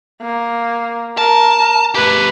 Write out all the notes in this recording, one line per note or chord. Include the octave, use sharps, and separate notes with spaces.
A#3
A#4 A5
A3 G4 B4